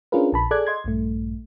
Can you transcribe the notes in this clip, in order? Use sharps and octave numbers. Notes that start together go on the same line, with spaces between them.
C#4 D4 F4 G#4 A#4 B4
A#1 A5 B5
G#4 A4 D5 D6 F#6 G#6
D#5 C6 G#6
A#1 G2 A3